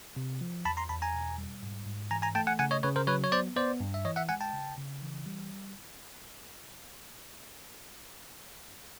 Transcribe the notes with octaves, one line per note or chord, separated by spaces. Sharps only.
C3
F3
E2 A5 B5
A#5 C6
E2 A5 B5
G#5 A#5
B2
G3
G#2
G#2
E3 G#5 A#5
G#5 A#5
A3 G5 A5
F#5 G#5
C#3 F#5 G#5
C#5 D#5
C#3 B4 C#5
A#4 C5
F#3 B4 C#5
C#5
B3 C5 D5
B3 C5 D5
G2
E5
E3 C#5 D#5
E5 F#5
G#3 F#5 G#5
G5 A5
C#3
C#3
E3
G3